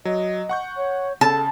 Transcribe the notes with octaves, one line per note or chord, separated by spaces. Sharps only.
F#3 D#5
F#5 C#6 G6
C#5
C#3 A4 A5